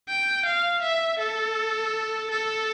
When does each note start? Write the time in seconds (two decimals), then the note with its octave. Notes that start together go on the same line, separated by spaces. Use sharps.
0.08 G5
0.45 F5
0.82 E5
1.19 A4
2.30 A4